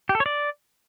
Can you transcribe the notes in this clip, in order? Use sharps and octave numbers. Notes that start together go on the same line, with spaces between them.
G4
A4
C#5
D5